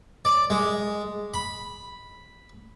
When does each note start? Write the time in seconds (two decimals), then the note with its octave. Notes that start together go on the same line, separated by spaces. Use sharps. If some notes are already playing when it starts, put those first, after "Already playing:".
0.25 D5
0.50 G#3
1.34 B5